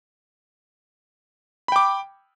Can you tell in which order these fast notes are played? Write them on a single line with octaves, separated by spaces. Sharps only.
B5 G5 D6